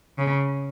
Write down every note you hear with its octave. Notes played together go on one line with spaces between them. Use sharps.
C#3